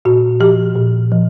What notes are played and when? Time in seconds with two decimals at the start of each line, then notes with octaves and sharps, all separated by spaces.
0.05 A#2 F#4
0.40 F3 G4
0.76 A#2
1.12 F3